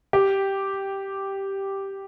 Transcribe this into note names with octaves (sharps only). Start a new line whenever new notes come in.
G4